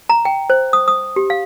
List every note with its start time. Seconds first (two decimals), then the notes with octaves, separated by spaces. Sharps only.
0.09 A#5
0.25 G5
0.50 C5
0.73 D#6
0.88 D#6
1.16 G4
1.30 F5